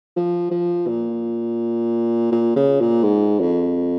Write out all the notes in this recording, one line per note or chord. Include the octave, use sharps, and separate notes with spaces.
F3
F3
A#2
A#2
C#3
A#2
G#2
F2